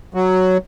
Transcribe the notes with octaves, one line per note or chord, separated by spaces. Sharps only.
F#3